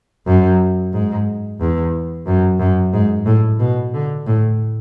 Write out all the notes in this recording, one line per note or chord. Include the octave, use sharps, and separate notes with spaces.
F#2
G#2
E2
F#2
F#2
G#2
A2
B2
D3
A2